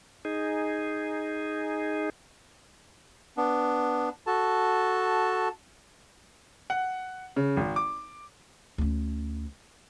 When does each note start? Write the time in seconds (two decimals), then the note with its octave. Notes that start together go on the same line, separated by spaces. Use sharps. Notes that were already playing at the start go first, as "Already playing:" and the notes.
0.25 D#4 G#4
3.37 B3 D4
4.27 F#4 A4 A5
6.70 F#5
7.36 C#3
7.57 G#1
7.76 D6
8.78 D2 C#4